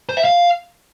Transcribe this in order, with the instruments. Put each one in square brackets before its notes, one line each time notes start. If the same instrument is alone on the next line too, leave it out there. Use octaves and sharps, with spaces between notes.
[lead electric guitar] C5
E5
F5